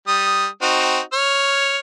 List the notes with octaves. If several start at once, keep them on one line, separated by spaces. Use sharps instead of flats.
G3 D#6
C4 D#4 F#4
C#5 F6